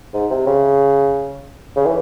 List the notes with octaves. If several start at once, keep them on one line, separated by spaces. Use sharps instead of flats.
G#2
C3
C#3
C#3
E3